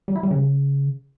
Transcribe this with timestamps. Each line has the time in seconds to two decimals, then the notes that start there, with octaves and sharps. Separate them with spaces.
0.08 G3
0.16 E4
0.23 G3
0.31 C#3